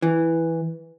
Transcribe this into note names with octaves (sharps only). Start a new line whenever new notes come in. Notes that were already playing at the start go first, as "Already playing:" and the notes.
E3